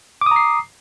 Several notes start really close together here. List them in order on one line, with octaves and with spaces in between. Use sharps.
D6 D#6 A#5 C7